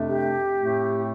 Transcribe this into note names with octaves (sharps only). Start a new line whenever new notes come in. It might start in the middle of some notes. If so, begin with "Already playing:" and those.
Already playing: F2 C3 A3 D4
G4
A2 A3 C4